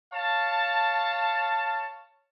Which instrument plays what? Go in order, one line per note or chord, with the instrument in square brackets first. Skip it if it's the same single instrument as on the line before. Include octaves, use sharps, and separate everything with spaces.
[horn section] C#5 F5 A5